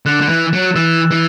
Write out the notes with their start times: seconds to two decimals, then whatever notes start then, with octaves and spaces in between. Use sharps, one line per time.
0.06 D3 F#6 A6 E7
0.21 D3
0.29 E3
0.53 F#3
0.76 E3 E6 A6 E7
1.11 E3